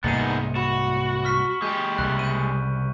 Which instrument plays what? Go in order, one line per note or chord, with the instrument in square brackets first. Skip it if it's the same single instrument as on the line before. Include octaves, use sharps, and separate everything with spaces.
[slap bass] C2 G#2 A#3 [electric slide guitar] B3 D#4 G#4 [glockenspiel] C#7 D#7
[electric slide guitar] F#4 [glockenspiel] B5 E7
[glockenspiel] C#6 F6 B6
[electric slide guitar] G#3 G4 [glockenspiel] G6
[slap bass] C2 C#3 [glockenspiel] F#6
[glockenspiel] G6 D#7